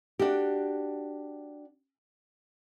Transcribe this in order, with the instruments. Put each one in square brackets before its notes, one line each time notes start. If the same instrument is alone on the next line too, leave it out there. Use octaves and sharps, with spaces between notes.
[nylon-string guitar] D4 F#4 G4